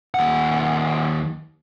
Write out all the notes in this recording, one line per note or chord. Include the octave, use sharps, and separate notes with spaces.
D#2 F#5